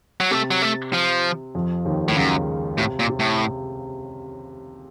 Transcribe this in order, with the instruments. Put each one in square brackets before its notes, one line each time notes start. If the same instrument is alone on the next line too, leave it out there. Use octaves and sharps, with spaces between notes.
[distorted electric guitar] F#3
[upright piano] C3 C4 [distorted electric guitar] A3
[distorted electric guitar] F#3
A3
F3
[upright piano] F2 F3
D#2 D#3
[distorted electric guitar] A2 [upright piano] D#3
[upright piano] C#2 C#3 [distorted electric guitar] F#2
[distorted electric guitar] A2 [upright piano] C3
[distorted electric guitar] A#2
[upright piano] C3
[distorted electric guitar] A2